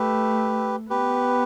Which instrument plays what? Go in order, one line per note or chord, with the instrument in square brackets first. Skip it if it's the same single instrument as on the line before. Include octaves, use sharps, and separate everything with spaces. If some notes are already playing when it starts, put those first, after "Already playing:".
Already playing: [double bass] A3 [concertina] G4 B4
[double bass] B3 [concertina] G4 B4